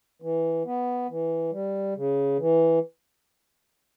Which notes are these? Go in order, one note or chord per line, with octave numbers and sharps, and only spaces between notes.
E3
B3
E3
G3
C#3
E3